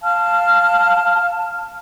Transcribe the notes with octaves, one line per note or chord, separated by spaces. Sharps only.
F5 A5 F6